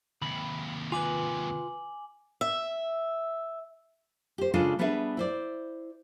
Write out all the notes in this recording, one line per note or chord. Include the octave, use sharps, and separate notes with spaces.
D#2 C3 B5
F4 B4 G#5 D6 F#7
E5
G4 C5
C#3 G#3 D4 F4 A4 C#5
G3 B3 D4 G#4 B4 E5
E4 C5 D5